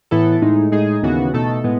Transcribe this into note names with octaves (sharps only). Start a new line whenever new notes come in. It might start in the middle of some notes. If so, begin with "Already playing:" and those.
A2 E3 B3 E4 A4
A2 G#3 D#4
A2 G#3 D#4 G#4
D#2 C#3 E3 B3 F#4
B2 A3 D#4 A4
A2 G#3 B3